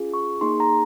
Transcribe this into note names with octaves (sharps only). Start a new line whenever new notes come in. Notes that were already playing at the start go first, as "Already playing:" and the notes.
Already playing: C#4 F4 G#4
C#6
A#3 D#4 G#4 C6
A#5